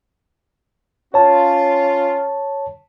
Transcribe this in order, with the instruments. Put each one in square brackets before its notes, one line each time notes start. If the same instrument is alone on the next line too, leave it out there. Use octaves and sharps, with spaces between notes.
[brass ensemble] C#4 F4 [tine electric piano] C#5 A5